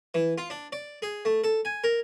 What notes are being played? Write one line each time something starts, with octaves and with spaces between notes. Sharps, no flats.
E3
F4
D4
D5
G#4
A3
A4
G#5
A#4